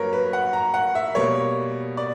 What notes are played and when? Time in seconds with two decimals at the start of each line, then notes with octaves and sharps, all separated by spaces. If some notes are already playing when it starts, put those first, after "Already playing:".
Already playing: G2 F#3 A#3 A#4 B4 C#5
0.13 B4
0.33 F#5
0.53 A#5
0.74 F#5
0.95 E5
1.15 B2 G3 A#3 C#5
1.97 D5